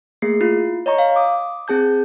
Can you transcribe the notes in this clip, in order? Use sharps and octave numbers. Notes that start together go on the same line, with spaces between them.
A3 A#3 G#4 C7
E4 F4 C7
C#5 D#5 A#5 C#6
F5
D6 D#6
C4 G#4 A5 G6